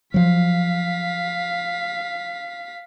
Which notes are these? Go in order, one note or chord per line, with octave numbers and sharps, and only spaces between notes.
F3 F#3 F5 B6